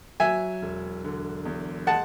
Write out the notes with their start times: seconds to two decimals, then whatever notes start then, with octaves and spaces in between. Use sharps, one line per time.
0.20 F#3 E5 G#5
0.62 E1
1.04 D3
1.45 E2
1.87 G#3 F#5 A5